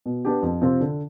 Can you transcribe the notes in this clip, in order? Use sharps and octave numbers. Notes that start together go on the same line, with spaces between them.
B2
B3 D4 G4
F2
C3 F3 C4 F4
D3